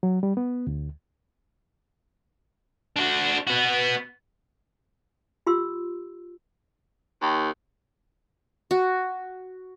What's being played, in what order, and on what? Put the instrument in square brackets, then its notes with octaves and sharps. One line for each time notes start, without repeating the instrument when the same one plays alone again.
[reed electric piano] F#3
G3
B3
D2
[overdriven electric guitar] D4 F#4
B3 F#4
[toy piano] F4 G4 C6 E6
[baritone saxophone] D#2
[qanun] F#4